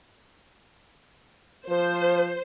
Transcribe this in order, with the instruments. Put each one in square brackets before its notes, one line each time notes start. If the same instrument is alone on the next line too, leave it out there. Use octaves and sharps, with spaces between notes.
[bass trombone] F3 [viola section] C5